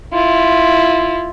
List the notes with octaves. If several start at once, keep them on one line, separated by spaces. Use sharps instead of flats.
E4 F4